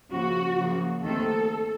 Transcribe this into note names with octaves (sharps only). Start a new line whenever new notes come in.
C#3 F3 A#3 F#4
C#3 F3 A#3
D#2 D#3 A3 C4 A4